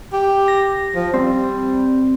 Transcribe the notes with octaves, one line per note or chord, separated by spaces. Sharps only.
G4
A#6
F3
G3 C4